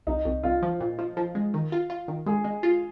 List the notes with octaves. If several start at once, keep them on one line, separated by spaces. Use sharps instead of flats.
C2 D#4
C2
C2 F4
F3
A#2
F3
F3
G#3
D#3
F4
F4
D#3
G#3 G#4
G#3
F4